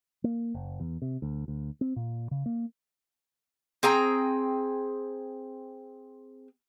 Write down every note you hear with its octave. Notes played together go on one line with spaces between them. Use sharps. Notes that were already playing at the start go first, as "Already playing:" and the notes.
A#3
F#1
E2
C3
D2
D2
C4
A#2
C#3
A#3
C4 G#4 G5 A#5